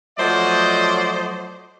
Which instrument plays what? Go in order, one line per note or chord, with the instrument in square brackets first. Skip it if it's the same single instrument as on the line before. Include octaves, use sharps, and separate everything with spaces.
[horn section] F3 F#3 A3 C5 D5 D#5